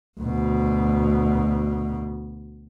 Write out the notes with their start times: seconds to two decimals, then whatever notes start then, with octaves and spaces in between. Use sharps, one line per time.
0.20 D2 B2